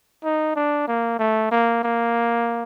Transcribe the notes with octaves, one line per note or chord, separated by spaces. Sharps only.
D#4
D4
A#3
A3
A#3
A#3